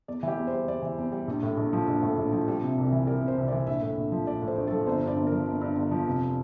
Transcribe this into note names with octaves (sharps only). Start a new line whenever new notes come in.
E2 D5
E3 G4
E2
C5
G3
E2 D5
E3
E2
G3
A#1
A2
A#1
F3
A#1
A2
A#1
F3
G3
C3
C2
E3
G3 A#4
C3
C5
C2
E3 D5
A#1 E5
A2
A#1
F3
A#1 D5
A2
C5
A#1
F3 A4
G1 C5
G2 D5
G1
A#4
F3
G1
G2
G1
F3
F1